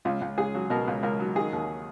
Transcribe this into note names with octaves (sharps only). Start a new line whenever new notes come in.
C#2 F4
C#2
C#2 G#4
F#3
B2 A#4
C#2
C#2 A#4
F#3
D#3 G#4
D#2